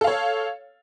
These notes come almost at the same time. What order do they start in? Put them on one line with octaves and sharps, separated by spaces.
A4 F5 C#5